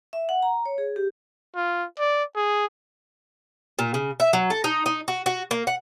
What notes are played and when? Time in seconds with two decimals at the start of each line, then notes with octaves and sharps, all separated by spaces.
0.13 E5
0.29 F#5
0.43 A#5
0.66 C#5
0.78 G#4
0.96 G4
1.56 F4
1.99 D5
2.36 G#4
3.79 A#2
3.94 C#3
4.20 E5
4.33 F#3
4.50 A4
4.64 D#4
4.86 D#4
5.08 F#4
5.26 F#4
5.51 A#3
5.67 F#5